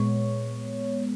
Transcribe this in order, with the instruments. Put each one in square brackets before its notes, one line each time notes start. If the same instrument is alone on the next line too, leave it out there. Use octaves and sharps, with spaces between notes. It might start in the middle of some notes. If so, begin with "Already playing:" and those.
Already playing: [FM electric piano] A#2 G#3 B3 C#5